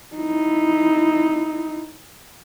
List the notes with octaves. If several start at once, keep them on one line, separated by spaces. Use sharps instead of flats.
D#4 E4